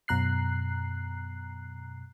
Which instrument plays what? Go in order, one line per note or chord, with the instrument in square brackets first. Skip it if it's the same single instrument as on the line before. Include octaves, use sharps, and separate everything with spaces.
[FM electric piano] F#2 B2 A#5 F#6 C7